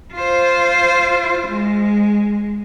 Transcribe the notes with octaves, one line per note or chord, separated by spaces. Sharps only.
F4 C5
G#3